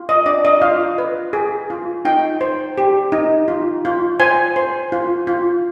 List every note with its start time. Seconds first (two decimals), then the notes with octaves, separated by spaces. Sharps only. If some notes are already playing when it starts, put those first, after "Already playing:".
Already playing: F4
0.09 D#5
0.26 D4 D5
0.45 D#5
0.61 F4 F5
0.98 B4
1.33 G#4
1.70 F4
2.05 D#4 G5
2.41 C5
2.78 G4
3.12 D#4
3.48 F4
3.85 F4
4.20 C5 G#5
4.56 C5
4.92 F4
5.27 F4